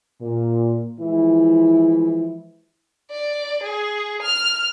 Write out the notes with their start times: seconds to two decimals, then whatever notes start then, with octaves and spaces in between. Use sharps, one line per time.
0.21 A#2
1.00 E3 F3 G#3 E4
3.11 D5
3.63 G#4
4.22 F6